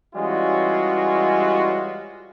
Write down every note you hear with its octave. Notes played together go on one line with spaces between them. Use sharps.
E3 G3 G#3 C#4 F4 F#4